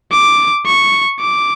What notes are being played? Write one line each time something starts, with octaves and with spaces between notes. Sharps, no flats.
D6
C#6
D6